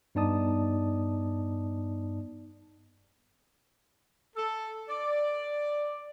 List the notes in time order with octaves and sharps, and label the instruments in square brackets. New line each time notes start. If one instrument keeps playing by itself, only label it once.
[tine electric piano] G2 B3 D#4 D5 A5 D#6
[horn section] A4
D5